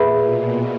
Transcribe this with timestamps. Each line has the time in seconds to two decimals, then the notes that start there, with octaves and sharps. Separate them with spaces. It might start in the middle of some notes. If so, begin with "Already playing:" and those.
Already playing: A#2 G#4 B4 E5 B5
0.19 B2